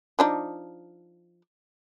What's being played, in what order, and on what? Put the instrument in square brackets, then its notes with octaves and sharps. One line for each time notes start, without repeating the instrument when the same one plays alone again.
[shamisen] F3 D4 D#4